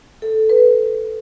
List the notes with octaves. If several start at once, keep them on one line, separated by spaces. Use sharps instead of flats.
A4
B4